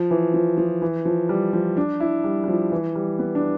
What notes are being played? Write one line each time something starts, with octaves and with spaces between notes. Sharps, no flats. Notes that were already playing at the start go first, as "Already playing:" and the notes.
Already playing: F3
E3
F3
F3
E3
F3
G3
F3
D4
E4
G3
G3
F3
E3
G3
B3
D4